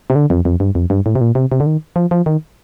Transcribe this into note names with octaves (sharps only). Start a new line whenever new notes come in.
C3
D3
F2
F2
G2
F2
G2
A2
C3
A#2
C3
C3
D3
D#3
F3
F3
D#3